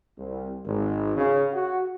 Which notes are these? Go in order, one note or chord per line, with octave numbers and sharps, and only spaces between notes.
C2
G#1
C#3
F#4